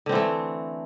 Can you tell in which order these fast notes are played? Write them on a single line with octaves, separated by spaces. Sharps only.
D3 C4 E3 A3